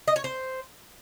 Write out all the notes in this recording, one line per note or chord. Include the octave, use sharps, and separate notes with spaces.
D#5
C#5
C5